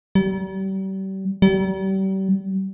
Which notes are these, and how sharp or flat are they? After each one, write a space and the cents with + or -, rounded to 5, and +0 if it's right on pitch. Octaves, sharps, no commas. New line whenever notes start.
G3 -35
G3 -35